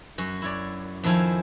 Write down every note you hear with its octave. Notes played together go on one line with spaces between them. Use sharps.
F#2 F#4
E4 C#5 D5
F2 D#3 F3 E4 F5 G#5